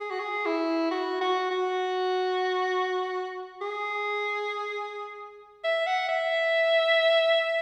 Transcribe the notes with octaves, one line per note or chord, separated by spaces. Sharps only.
G#4
F#4
G#4
E4
F#4
F#4
F#4
G#4
E5
F#5
E5